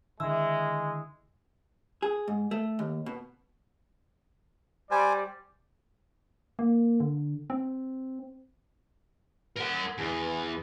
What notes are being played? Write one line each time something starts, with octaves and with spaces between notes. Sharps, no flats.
D3 D#3 G#3 E4 E6
G#4
G#2
A3
D#2
B2
G3 C5 D5 G#5
A#3
D3
C4
A#4 F#5
E2